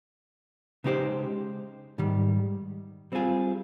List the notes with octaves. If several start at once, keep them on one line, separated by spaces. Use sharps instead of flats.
C#3 G#3 D#4 G4 C5
G#2 D#3 G3
G3 C4 F4 G#4